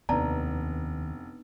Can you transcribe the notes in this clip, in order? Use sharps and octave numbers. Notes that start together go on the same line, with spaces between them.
F1 D#2 B3 D4 D#4 D5 A5 A#5